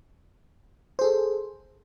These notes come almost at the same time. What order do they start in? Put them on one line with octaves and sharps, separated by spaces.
C5 G#4 A4